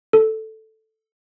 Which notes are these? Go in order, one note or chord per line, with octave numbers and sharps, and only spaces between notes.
A4